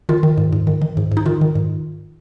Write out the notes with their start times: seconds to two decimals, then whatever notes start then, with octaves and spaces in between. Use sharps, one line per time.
0.09 D#3 F4
0.23 D#3
0.38 G#2
0.53 G#2
0.67 D#3
0.82 D#3
0.97 G#2
1.12 G#2
1.17 D#4
1.26 D#3 F4
1.41 D#3
1.55 G#2